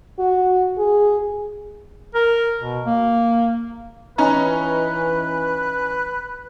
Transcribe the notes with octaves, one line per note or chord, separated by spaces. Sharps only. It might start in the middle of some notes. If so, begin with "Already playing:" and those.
F#4
G#4
A#4
B2
A#3
E3 C#4 D#4 B4 A#5